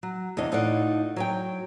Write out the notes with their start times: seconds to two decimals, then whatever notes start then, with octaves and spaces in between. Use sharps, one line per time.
0.03 F#3
0.37 E2 C3 D4 D#5
0.52 A2 D#4 F4 D5 F#5
1.16 F#3 C#5 G5